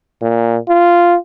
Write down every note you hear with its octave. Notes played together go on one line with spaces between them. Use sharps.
A#2
F4